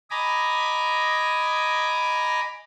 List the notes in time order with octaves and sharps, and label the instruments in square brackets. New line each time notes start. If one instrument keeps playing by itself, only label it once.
[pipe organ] D#5 G#5 A#5 B5 D6